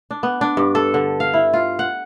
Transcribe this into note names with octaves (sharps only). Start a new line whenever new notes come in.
D4
B3
D4
G2
A4
D3
F5
E4
F4
F#5